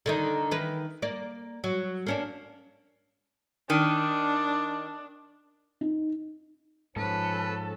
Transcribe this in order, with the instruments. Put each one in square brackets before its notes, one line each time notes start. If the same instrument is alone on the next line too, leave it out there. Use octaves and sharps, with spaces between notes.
[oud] D3 D#3 D#4
D#3 E3 B4
A#3 D5
F#3
A#3 C#4 D4
[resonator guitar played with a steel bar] D#3 [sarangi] D4
[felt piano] D#4
[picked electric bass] G#2 [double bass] F3 C#4 [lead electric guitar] A4 [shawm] B4